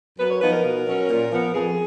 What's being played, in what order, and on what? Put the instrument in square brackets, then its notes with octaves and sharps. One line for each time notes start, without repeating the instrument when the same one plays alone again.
[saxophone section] F#2 B4
C#5
F3 B3 D#4 B4
A#4
B2
F#3 C#4
A#2
F3 B3
F2 G#4